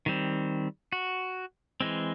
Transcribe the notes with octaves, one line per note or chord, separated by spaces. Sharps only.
D#3 G3 C4
F#4
E3 G#3 C4